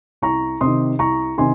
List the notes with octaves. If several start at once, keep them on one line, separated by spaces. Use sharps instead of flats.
C2 A#5 C#6
C3 D#3 C6 D#6
C2 A#5 C#6
C3 D#3 G#5 C6